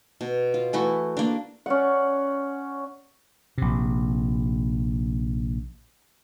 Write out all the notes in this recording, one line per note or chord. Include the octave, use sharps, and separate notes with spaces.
B2
F4
E3 A3 E4 F#4
A#3 D4
C#4 D5 F#5
A#1 C3